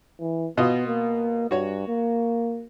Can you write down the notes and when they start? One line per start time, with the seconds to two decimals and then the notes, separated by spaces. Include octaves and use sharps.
0.20 E3
0.57 B2 B3 F4 D#5
0.87 A#3
1.51 G2 F#4 C#5
1.88 A#3